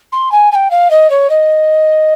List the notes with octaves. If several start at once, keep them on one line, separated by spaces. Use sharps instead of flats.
C6
G#5
G#5
G5
F5
D#5
C#5
D#5